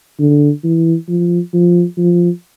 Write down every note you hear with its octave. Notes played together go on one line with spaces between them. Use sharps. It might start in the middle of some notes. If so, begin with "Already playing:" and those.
D3
E3
F3
F3
F3